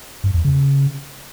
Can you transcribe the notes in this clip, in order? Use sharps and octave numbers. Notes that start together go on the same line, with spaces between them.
G2
E2
C#3